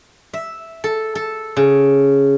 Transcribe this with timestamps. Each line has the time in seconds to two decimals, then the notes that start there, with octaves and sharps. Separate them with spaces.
0.33 E5
0.84 A4
1.15 A4
1.57 C#3